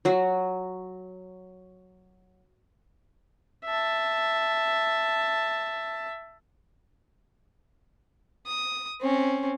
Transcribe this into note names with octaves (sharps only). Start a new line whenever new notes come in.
F#3 F#4
E5 A5
D#6
C4 C#4